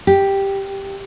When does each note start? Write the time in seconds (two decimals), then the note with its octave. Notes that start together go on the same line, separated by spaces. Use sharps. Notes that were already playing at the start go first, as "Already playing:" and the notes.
0.07 G4